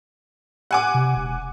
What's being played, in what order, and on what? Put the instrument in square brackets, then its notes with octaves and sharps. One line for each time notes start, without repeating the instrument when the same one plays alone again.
[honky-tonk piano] F#5 G#5 D6
[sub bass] C3
E1